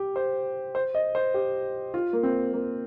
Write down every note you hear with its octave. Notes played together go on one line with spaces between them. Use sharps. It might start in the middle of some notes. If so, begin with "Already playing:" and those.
Already playing: G4
C5
C5
D#5
C5
G4
F4
A#3
C4
A#3